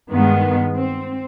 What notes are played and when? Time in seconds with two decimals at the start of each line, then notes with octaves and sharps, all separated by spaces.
0.11 G2 D#3 G#3 B3
0.74 C4